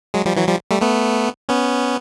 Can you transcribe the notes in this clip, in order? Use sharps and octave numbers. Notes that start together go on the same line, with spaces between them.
F#3 G#3
F3 G3
E3 F#3
F3 G3
G3 A3
A3 B3
B3 C#4